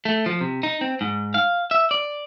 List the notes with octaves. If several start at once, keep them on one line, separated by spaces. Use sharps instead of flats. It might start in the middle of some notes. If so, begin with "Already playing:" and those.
A3
F3
C3
D#4
C4
G#2
F5
E5
D5